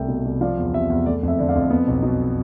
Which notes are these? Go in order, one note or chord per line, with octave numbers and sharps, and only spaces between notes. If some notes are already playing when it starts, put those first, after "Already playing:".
Already playing: C2 A3 E5 G5
B2
C2
F3 D5 F5
E2
C3 E5
E2
A3 D5
F2
E5
D3
D5 F5
F2
B3
B1
B2